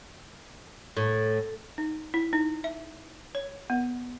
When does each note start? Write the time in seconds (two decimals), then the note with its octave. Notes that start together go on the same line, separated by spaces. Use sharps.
0.97 A2
1.78 D#4
2.14 E4
2.33 D#4
2.64 E5
3.35 C#5
3.70 B3